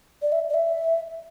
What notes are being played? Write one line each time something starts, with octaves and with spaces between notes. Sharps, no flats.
D5
E5
D5
E5